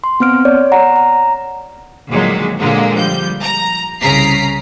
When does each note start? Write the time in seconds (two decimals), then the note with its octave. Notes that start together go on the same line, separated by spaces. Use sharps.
0.04 C6
0.20 B3 C4 F6 D7
0.45 C#5 D5
0.72 F#5 A#5
0.96 A#5
2.10 A#2 D3 D#3 F3 F#3 G#3
2.59 A#2 D3 F3 F#3 G#3 A#3
2.93 F3 G3 G6
3.43 A#5
4.02 C2 C#3 A#5 B6 C7